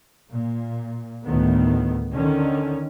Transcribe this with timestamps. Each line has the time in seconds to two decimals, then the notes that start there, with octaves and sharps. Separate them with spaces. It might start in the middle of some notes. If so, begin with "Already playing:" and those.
0.32 A#2
1.25 D2 A2 D#3 B3
2.12 D3 D#3 C#4